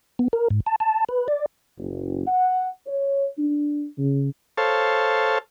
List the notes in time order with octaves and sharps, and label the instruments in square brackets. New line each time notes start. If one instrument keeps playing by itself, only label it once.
[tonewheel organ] B3
A#4
G#2
A5
A5
B4
D5
[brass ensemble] F#1
F#5
C#5
D4
C#3
[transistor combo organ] A4 C5 C#5 F5 A5